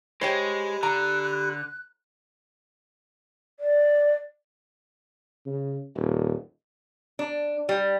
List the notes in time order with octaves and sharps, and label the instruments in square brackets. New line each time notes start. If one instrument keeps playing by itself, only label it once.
[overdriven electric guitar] G#3 [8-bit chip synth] G4 B5 [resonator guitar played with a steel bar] C5 C#5 G5
[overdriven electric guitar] D3 [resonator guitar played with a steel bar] A#5 [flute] F#6
[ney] D5
[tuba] C#3
D#1
[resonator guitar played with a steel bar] D4
G3